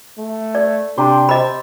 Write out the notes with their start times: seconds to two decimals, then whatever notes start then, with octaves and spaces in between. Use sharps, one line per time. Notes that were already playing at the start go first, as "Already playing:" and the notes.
0.18 A3
0.55 D5
0.98 C3 D4 G4 C6
1.29 C5 D#5 B5 E6